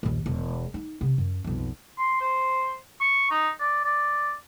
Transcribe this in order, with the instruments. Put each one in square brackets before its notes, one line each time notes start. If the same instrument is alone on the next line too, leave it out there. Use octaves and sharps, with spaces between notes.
[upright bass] A#1 D#2
E1
D#4
C3 C4
F#2
B1 F2
[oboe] C6
C5
C#6
D#4
D5
D5